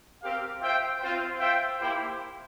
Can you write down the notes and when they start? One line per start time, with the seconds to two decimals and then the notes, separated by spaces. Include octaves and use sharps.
0.22 C4 G4 A#4 F5
0.60 F4 C5 E5 G5
1.00 C4 F4 C5
1.39 F4 C5 E5 G5
1.79 A#3 E4 G4 C5 G5